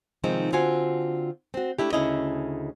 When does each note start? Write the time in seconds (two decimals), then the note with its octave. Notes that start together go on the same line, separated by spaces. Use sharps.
0.23 C3 D#3 F3 G#3 C4 D#4
0.52 D3 C4 F4 F#4 G#5
1.54 C4 F#4
1.78 A3 D4 E4 G4
1.93 D2 C#3 C#4 D#4 E4 D#5